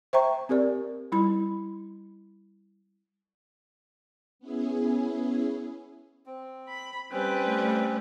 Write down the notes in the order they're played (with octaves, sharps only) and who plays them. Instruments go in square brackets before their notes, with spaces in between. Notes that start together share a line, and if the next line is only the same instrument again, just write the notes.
[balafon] C5 E5 G5 A#5 C#6
C4 G4 A#4 D5
G3 E4 B5
[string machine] B3 C#4 E4 G#4
[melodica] C4
[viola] B5
[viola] G3 B4 [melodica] C4 C#4
[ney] A3